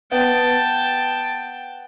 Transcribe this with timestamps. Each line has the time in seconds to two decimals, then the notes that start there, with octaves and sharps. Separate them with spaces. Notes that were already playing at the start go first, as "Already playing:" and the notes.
0.12 B3 G5 A5